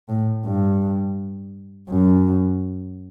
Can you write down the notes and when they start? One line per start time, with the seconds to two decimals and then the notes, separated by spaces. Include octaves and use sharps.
0.09 A2
0.45 G2
1.90 F#2